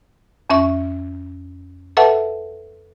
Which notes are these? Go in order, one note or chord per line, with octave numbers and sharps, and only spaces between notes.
F2 C#4 E5 C#6
A4 B4 E5 F#5 A5